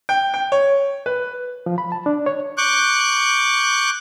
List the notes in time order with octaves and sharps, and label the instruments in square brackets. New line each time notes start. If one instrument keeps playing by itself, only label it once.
[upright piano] G5
G5
C#5
B4
[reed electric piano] F3
B5
A5
D4
C#5
[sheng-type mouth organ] C#6 D6 F#6 G6